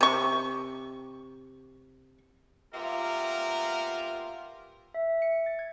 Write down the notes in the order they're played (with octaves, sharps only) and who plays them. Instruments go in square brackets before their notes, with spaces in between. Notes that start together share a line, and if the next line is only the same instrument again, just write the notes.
[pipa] C3 C#6
[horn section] A#3 B3 A#4 [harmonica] F4 G4 E5
[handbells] E5
C#7
A6
G#6